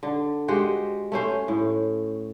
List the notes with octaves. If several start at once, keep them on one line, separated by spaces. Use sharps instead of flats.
D3
G#3 F#4 G4 C5
A3 C#4 C5
A2